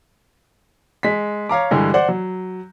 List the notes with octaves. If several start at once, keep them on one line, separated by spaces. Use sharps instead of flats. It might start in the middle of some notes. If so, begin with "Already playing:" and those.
G#3 B6
C#5 F5 A#5 D6
G2 D3 E3 G3 G#3
C5 D5 F#5
F#3